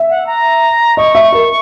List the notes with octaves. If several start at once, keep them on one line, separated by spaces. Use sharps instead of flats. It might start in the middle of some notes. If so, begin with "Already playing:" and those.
Already playing: E5
F#5
A#5
D#5 C#6
E5
A#4